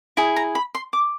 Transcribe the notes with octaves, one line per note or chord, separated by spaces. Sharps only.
E4 G#4
A#5
B5
C6
D6